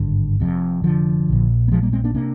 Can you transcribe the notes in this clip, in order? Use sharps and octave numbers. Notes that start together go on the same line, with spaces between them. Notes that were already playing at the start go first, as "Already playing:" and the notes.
Already playing: G#1 G2 D3
F1 F2 C3
D3 F3
A#1 A#2
A#3
F3 G#3
G3 A#3
G#3 C4
A#3 D4
C3 A#3 D4